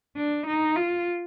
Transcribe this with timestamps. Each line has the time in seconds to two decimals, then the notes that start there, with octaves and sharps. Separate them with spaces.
0.17 D4
0.46 D#4
0.76 F4